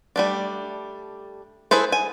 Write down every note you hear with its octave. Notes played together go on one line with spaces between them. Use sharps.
G3 A3 D4
E4 G#4 A4 B4 C5
G#5